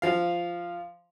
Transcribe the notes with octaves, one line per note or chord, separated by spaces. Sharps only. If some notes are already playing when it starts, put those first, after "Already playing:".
F3 F5